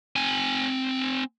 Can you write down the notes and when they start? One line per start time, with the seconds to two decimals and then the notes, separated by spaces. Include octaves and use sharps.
0.16 C4 G#5